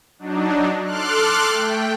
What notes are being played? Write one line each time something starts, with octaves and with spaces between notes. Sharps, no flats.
F#3 D4 D#4
A4 C6 D6 F6 F#6
A3 G5